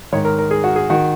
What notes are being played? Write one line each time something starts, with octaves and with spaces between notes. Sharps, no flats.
G#2 D#3 C#5
A#4
A#4
G#4
F#4
G#4
D#3 F#4